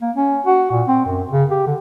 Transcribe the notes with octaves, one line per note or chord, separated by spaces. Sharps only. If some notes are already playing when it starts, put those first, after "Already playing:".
A#3
C#4
F#4
A#2
C4
F#2
C#3
G4
D3